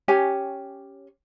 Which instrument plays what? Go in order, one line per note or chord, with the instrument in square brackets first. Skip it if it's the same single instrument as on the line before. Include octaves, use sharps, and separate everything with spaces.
[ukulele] C#4 G4 C#5 G#5